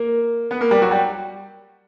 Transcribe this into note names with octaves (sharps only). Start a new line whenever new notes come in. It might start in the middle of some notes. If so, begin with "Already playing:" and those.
Already playing: A#3 A#4
B3 B4
A#3 A#4
G3 G4
F#3 F#4
G3 G4